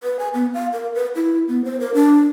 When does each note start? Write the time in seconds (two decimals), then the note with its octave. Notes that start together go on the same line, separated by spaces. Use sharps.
0.03 B4
0.19 G#5
0.34 B3
0.54 F5
0.73 A#4
0.95 B4
1.15 E4
1.48 B3
1.65 C5
1.80 A#4
1.94 D4